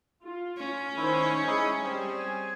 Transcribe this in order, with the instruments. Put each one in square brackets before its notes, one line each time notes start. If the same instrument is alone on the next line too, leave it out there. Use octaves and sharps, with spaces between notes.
[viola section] F4
[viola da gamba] C#4
[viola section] D#3 C5 [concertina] E4
[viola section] G#3 [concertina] D#4 E4 G#4
[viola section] G3 [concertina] C4 G#4
[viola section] G#5